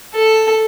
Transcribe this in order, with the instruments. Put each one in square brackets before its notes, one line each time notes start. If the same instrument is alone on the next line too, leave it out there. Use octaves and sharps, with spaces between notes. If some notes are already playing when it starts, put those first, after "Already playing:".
[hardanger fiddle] A4